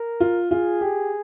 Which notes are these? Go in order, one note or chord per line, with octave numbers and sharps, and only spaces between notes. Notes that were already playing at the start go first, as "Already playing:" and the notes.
Already playing: A#4
F4
F4 G#4
G4